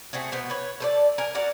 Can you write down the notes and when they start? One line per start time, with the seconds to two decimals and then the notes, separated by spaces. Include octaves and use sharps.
0.13 A3 C4 F#4 G#4
0.32 B2 B3 C5
0.50 B4 C#5
0.80 A4 C5 D5
1.18 A#4 G#5
1.35 F#4 A#4 D5